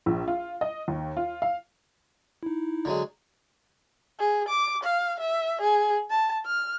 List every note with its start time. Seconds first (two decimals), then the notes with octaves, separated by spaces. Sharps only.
0.06 A#1
0.28 F4
0.61 D#5
0.88 D#2
1.17 F4
1.42 F5
2.43 D#4 E4
2.85 D3 F#3 G#3
4.19 G#4
4.48 D6
4.83 F5
5.20 E5
5.61 G#4
6.10 A5
6.46 F6